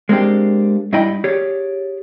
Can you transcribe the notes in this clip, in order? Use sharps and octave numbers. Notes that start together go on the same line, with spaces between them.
G#3 A#3 C4 D4 G4
G2 D#4 E4 D#5 G5 B5
G4 G#4 C#5 D5